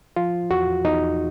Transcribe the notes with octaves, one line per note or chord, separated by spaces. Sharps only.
F3 F4
E2 F#4
E2 D#4